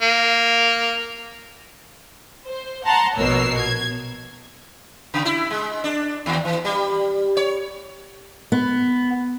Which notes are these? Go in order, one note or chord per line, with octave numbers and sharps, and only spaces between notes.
A#3
C5
F#5 A5 A#5 C6 A6
A#1 B2 A#4 C#5 E6 C7
G#6
C#3
E4
G#3
D4
D#2
E3
G3
C#5
B3